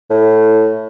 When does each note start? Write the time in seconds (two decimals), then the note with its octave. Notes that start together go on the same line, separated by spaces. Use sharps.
0.10 A2